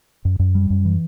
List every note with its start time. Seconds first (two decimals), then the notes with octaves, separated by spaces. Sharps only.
0.25 F#2
0.39 F#2
0.55 G3
0.70 F#2
0.85 E3